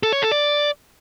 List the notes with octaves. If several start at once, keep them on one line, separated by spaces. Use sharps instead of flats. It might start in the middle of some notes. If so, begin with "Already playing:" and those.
A4
C#5
A4
D5